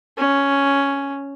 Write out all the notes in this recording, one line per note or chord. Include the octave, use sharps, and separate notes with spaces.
C#4